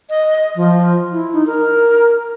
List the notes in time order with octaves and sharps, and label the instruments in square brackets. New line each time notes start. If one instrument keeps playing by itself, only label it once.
[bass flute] D#5
F3
E4
D#4
A#4